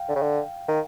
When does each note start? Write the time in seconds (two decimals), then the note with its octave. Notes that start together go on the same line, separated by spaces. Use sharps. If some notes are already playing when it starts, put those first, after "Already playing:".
Already playing: F5 G5
0.09 D3
0.15 C#3
0.22 D3
0.68 D#3